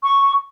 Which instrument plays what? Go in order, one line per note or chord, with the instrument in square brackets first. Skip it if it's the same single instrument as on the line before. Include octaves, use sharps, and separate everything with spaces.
[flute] C#6